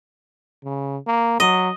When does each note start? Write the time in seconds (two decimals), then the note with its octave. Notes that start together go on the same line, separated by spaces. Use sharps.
0.65 C#3
1.07 A#3
1.40 F#3 D#5